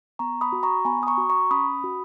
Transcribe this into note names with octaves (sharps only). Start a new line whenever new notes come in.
B3 A#5 C#6
B5 D#6
F#4
A#5 C#6
B3 G#5 B5
D#6
A#5 C#6
F#4
A#5 C#6
C#4 B5 D#6
F#4